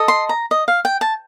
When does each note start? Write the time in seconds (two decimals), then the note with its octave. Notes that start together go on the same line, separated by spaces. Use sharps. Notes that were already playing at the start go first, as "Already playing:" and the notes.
Already playing: A4 D#5
0.08 C6
0.29 A#5
0.51 D#5
0.68 F5
0.85 G5
1.01 A5